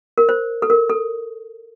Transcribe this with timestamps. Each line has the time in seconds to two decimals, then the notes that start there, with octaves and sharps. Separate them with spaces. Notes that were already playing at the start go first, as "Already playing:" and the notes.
0.18 A#4
0.29 C5
0.62 A4
0.70 A#4
0.89 A4